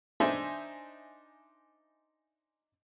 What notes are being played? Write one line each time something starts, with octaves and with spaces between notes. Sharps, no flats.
D4 D#4 C5 E5 G#5 C6